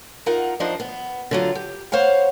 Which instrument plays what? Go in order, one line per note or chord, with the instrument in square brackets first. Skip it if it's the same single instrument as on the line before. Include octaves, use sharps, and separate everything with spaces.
[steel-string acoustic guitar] D#4 F4 A#4 F#5
F3 D4 D#4 C5 D#5
B3
D3 F#3 F4
G4
B3 C5 C#5 F5 F#5